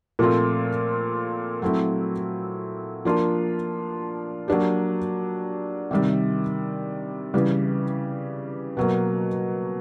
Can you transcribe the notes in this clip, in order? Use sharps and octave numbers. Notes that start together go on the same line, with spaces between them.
A#2 F3 A3 C4 F4
F#3 A3 C4 E4
F3 A#3 D4 F4
F#3 A#3 D4 G4
C3 D#3 G3
C#3 E3 G3
B2 F#3 A#3